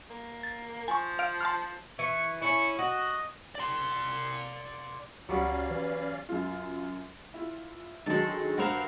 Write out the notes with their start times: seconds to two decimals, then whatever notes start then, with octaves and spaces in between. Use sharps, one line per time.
0.10 A#3
0.43 A6
0.88 F3 G#5 C#6
1.19 F5 F6 D7
1.41 A5 C6 F6
1.99 E3 C#6
2.42 C#4 E4 C#6
2.79 F#4 D#5
3.55 D5 C6
5.29 C#2 F#3 G3 B3 C#4 D5 F5
5.70 E3 B4
6.29 F#2 F4
7.34 E4 F4
8.06 D3 D#3 F#3 G#3 A4
8.58 G2 F#4 A#4 C5 F5 E7